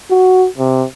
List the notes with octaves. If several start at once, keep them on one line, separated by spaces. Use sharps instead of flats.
F#4
C3